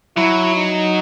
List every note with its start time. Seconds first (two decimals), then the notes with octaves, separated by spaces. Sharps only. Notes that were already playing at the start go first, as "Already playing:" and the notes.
0.17 F#3 E4
0.56 D#4